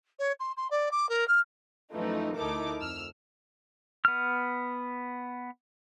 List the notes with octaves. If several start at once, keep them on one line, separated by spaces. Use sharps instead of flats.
C#5
C6
C6
D5
D6
A#4
F6
F#2 E3 F3 A3 D#4
D2 D#4 E4 A4 A#4 D6
F2 E6 F6
B3 F6